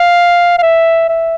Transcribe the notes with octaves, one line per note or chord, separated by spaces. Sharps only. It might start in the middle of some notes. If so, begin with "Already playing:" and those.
Already playing: F5
F5
E5
E5